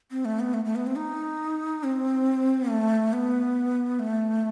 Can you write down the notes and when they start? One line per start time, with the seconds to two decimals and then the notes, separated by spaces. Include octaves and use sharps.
0.11 C4
0.25 A3
0.40 B3
0.54 A3
0.65 A3
0.76 B3
0.86 C4
0.97 D#4
1.84 C4
2.70 A3
3.13 B3
3.99 A3